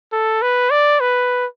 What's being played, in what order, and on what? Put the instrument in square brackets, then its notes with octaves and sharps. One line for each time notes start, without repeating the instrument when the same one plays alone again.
[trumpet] A4
B4
D5
B4